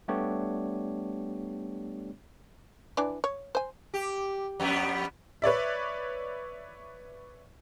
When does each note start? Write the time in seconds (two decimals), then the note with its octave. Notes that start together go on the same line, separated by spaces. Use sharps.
0.08 G3 A3 B3 D4 G4 C#5
2.97 E3 D4 D5
3.24 C#5
3.55 C5 G#5
3.94 G4
4.60 F2 G3 B3
5.42 B4 C#5 D5 E5